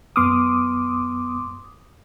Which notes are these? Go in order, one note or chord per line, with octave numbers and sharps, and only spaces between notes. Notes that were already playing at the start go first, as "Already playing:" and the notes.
F#2 B3 C6 D6 D#6 F6